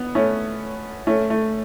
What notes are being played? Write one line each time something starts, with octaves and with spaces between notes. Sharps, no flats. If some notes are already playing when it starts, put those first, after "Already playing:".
Already playing: B3
A3 C#4
A3 C#4
A3